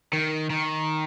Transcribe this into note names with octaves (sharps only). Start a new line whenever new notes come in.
D#3
D#3